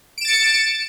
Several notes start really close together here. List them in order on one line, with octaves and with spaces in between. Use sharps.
D7 E7 A6 C#7